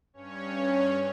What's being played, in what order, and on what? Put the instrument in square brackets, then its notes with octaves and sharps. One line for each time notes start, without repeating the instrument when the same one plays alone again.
[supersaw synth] G2 C#4 C#5